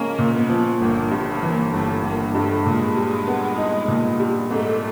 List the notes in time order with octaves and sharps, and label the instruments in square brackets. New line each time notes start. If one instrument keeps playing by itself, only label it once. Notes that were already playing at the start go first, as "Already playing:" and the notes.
Already playing: [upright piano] F3 G#3 C#4 [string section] A#3
[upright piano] A#2
[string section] B3
[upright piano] F3
[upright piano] G1 [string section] A#3
[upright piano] G2
[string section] A#3
[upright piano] E3
[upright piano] G1 [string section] A3
[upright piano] G1 [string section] A#3
[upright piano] G2 [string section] A3
[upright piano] A#2 [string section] G#3
[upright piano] G3
B3
D#4
A#2
G3
[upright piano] G#2 [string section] A3